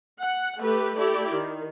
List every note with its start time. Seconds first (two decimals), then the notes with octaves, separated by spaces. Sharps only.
0.21 F#5
0.60 A3 G4 B4
0.96 A3 E4 G4 D5
1.34 D#3